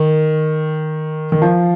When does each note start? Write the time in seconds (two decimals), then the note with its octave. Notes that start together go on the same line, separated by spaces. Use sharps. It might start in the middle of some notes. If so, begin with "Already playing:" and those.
Already playing: D#3
1.32 D#3
1.42 F3